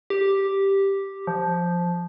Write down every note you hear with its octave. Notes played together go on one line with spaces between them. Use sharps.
G4
F3